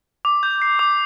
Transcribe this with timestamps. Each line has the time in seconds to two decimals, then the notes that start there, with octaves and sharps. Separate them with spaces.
0.25 D6
0.43 G6
0.62 C7
0.79 D6